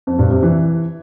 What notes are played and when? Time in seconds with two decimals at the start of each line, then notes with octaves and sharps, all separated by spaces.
0.07 F2
0.19 G2
0.31 C3
0.43 E3